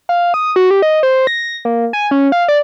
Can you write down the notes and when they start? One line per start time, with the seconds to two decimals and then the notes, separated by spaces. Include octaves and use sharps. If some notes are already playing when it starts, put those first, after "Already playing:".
0.09 F5
0.34 D#6
0.56 F#4
0.71 G4
0.82 D#5
1.03 C5
1.27 A#6
1.65 A#3
1.93 G#5
2.11 C#4
2.32 F5
2.48 D5